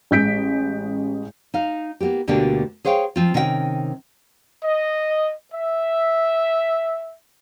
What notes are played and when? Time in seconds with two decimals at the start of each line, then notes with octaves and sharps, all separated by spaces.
0.11 A1 G#3 G6 B6 D7
1.54 D#4 F5
2.00 A#3 B3 E4 G4
2.28 D2 B2 D3 A#3 D4 G4
2.85 G#4 C5 C#5 F5 G5
3.16 F3 C4 F4
3.34 C3 D#3 C#4 F5 G5
4.63 D#5
5.52 E5